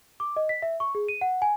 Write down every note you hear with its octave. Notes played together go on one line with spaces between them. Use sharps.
D6
D#5
B6
E5
C#6
G#4
D#7
F#5
G#5